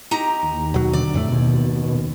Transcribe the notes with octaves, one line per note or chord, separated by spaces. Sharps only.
D#4 G4 A#5
D#2
D#2 B2 F#3
D3 D5
F2 A2 A3
F#1 D#2 B2